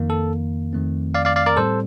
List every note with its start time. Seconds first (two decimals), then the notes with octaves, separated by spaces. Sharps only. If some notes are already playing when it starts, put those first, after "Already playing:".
Already playing: F2 D#3 A#3
0.10 A4
0.73 F2 D#3 A3 C4
1.14 D5 F5
1.25 D5 F5
1.36 D5 F5
1.46 A#4 D5
1.57 A2 G3 C4 A4 C5